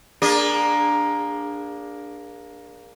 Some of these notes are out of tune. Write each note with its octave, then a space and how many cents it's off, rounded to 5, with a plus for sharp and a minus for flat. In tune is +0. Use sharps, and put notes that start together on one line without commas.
A#3 +10 D4 +0 G#4 -30